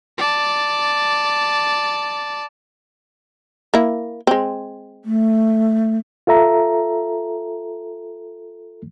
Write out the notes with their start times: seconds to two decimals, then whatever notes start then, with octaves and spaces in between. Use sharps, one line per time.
0.18 D5 A5
3.74 A#3 E4
4.27 G#3 C4
5.05 A3
6.27 F4 A4 E5 A#5